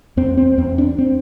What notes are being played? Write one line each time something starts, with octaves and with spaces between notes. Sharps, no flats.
E2 C4
C4
E2 C4
D4
C4